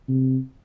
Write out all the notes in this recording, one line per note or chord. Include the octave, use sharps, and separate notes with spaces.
C3